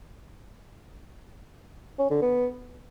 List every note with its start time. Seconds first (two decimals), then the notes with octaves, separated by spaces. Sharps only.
1.99 C#4
2.11 D3
2.22 B3